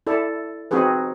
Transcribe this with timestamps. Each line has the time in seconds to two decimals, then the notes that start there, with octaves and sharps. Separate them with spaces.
0.07 E4 A4 D5
0.71 C4 D#4 F#4 G#4 B4